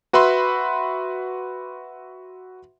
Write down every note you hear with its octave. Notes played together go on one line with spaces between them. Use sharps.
F#4 B4 E5 B5 C6